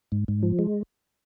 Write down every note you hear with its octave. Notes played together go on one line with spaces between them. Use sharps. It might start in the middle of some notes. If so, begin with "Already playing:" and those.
G#2
G#2
F3
G#3